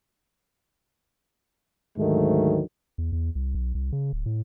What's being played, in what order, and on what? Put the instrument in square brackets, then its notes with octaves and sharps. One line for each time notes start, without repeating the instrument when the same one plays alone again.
[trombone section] D2 G#2 D#3 F#3 A3
[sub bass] E2
E2
C2
B1
C2
C#3
D1
A2